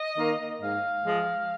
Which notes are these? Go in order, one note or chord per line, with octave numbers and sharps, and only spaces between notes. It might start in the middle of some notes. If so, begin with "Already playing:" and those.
Already playing: D#5
D#3 A#3
G#2 F5
F3 G#3